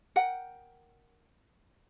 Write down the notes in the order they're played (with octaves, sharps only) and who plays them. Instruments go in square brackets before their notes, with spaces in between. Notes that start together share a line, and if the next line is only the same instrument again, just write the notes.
[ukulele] A#4 F#5 G5